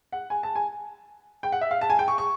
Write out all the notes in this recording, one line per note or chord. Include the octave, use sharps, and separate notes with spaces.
F#5
G#5
A5
G#5
G5
F#5
E5
F5
A5
G#5
G5
C#6
C#6